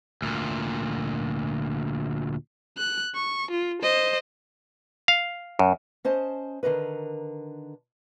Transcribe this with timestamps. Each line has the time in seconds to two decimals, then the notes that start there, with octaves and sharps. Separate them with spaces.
0.22 D2 A#2
2.78 F#6
3.15 C#6
3.51 F4
3.82 C5 D#5
5.08 F5
5.59 F#2
6.05 C#4 C5 D#5 A5
6.63 D3 D#3 A#4 B4